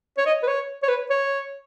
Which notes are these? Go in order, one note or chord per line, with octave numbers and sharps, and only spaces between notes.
C#5
D#5
B4
C#5
C#5
B4
C#5